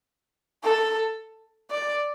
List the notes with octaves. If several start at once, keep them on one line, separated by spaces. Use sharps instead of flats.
A4
D5